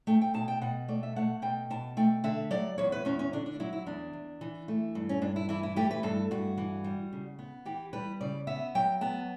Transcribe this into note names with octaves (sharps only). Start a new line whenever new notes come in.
A3 G5
G5
B2 A5
G5
B2 F#5
A3 D5
E5
A3 F#5
B2 G5
B2 A5
A3 G5
D3 E5
F#3 D5
E2 C#5
B4
E2 C#4
C#4
D3 D4
D4
F#3 E4
E4
E2 D4
E2
E3
A3
G2
C#4
G2 D4
E4
E3 E4
E4
A3 G4
B4
G2 A4
G2 F#4
E3
G3
C#3
B3
E3 G4
G3 B4
C#3 D5
B3 E5
F#3 G5
B3 A5